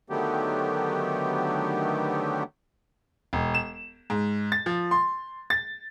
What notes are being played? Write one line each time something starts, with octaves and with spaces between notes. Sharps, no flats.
D3 D#3 F#3 A3 B3 G4
E1
E7
G#2
A6
F3
C6
A6